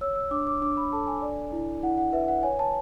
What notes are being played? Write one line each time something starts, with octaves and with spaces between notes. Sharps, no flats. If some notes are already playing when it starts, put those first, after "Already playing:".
C#5 E6
E6
D4 D6
D6
D4 D6
B5
A4 A5
G#5
D5
E4
E4 F#5
F#5
B4 E5
F#5
C#5 G#5
A5